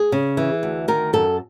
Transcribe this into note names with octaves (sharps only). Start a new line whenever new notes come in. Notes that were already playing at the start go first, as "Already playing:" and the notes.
Already playing: G#4
C#3
E3
D2
D#3 A#4
F#2 A4